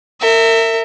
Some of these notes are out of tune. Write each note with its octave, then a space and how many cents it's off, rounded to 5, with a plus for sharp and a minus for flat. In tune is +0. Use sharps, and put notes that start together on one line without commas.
A#4 -35 E5 +0